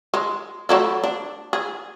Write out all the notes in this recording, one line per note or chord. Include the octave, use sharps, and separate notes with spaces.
G#3
F#3 A3 E4
D4
G#4